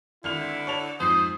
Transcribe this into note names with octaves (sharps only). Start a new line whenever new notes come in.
G#1 D3 E4 F6 F7
C#5 A5 F7
F2 G#2 C5 D#6 C7